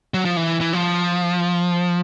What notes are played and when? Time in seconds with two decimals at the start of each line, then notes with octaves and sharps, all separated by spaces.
0.14 F#3
0.25 F3
0.37 E3
0.61 E3
0.73 F3